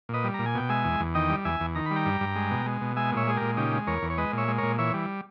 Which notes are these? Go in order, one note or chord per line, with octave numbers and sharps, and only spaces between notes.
A#2 B4 D#5
G3
A#2 A#5
G#5
B2 G5
G#3 E5 G#5
E2
E2
D#3 D#5 G5
G3
E2 E5 G#5
E2
D#3 A#5
G3 B5
G5 A#5
G2
G2
G#3
B2
G#3
B2
G#3 E5 G#5
A#2
C#5 E5
G#3 G#4
A#2 G4 A#4
C#3 D#4 G4
G#3
E2 A#4 C#5
E2
C#5
G#3 B4 D#5
A#2 C#5 E5
G#3
A#2 A#4 C#5
E3 C#5 E5
G3